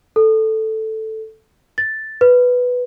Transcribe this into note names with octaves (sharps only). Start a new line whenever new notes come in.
A4
A6
B4